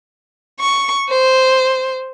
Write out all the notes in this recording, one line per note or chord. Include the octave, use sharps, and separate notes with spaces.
C#6
C5